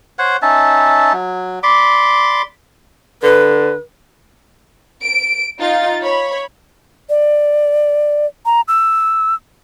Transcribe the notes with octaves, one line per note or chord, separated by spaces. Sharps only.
C5 C#5 F#5
C#4 D#4 E5 A5
F#3
D5 B5 C6 D6
D3 B4
D7
D#4 F4 A6
C#5 B5
D5
A#5
E6